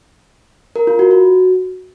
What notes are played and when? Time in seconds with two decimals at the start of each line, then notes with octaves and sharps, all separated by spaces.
0.76 A#4
0.87 F4
0.99 F#4
1.11 F#4